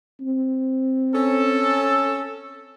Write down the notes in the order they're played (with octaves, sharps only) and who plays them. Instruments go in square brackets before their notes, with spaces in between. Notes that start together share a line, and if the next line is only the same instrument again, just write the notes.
[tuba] C4
[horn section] C#4 A4